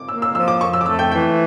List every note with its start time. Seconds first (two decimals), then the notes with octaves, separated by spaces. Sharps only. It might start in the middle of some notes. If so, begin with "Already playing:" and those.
Already playing: D6
0.09 A#3 E6
0.22 E6
0.34 F3 E6
0.48 D6
0.61 F2 C#6
0.73 E6
0.81 D6
0.86 A3 E6
0.99 G5
1.11 E3 G5